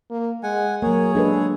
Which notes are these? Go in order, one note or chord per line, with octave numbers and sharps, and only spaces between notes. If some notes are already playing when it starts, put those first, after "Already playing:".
A#3
G#3 F#5 G#5
F#3 A#3 G#4 A#4 C#5
G#3 D4 A4 B4